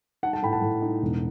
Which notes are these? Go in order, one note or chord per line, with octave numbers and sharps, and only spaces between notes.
D#4 F#5 A5
F#5 A5
A2 G5 B5
F#5 A5
A2
D#4
E1